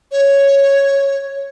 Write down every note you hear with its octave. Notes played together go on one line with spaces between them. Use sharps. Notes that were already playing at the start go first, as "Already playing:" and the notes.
C#5